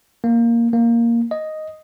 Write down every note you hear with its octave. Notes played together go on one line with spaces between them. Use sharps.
A#3
A#3
D#5